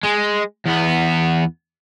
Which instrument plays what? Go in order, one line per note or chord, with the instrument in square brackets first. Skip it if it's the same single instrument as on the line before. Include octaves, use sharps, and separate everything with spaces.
[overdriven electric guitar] G#3
E2 B3